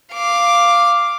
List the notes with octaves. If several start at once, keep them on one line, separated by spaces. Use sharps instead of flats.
F5 D6